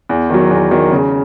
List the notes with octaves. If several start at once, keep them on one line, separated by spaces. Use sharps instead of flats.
E2
D#3 F#3
E2
D#3 F#3
C#3